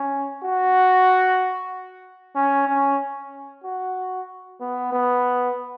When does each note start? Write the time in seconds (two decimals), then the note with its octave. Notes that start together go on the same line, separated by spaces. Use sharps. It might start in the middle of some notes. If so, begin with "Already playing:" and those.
Already playing: C#4
0.43 F#4
2.35 C#4
2.68 C#4
3.64 F#4
4.60 B3
4.92 B3